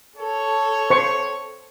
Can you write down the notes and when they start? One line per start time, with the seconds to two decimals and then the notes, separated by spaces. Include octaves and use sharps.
0.18 A4 C#5
0.90 C5 C#6